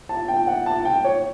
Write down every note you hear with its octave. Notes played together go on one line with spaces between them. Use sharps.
A5
G5
F#5
A5
G5
C#5